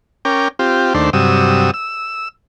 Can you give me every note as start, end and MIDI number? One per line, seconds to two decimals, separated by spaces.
0.25 0.48 61
0.25 0.48 70
0.25 0.48 79
0.25 0.48 86
0.59 0.93 60
0.59 0.93 65
0.59 0.93 67
0.94 1.10 39
0.94 1.10 57
0.94 1.10 62
0.94 1.10 72
1.13 1.71 43
1.13 1.71 48
1.13 1.71 54
1.13 1.71 87
1.13 1.71 88
1.74 2.28 88